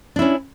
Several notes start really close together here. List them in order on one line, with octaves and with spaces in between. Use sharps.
D4 E4 C#4